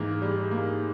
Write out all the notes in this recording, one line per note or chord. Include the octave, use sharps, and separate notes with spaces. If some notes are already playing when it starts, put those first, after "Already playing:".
Already playing: G#2 E3 A#3
G3
A#3